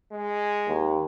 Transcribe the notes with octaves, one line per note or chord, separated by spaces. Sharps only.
G#3
D#2